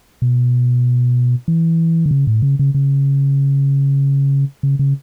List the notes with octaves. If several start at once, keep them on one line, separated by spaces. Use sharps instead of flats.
B2
E3
D3
C#3
A2
C#3
C#3
C#3
C#3
C#3